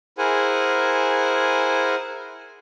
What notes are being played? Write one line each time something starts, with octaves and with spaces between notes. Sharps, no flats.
E4 G#4 A#4 C5 F#5 G#5